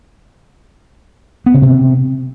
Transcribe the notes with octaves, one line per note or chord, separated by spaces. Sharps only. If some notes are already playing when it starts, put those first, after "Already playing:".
B3
C#3
C3